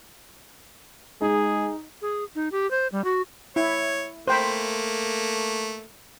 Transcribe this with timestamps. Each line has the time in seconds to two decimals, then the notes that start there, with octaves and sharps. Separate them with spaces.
1.22 G#3 D#4 G#4
2.02 G#4
2.35 D#4
2.52 G4
2.71 C5
2.92 G3
3.04 F#4
3.56 E4 C#5
4.28 A3 A#3 C5 G5 B5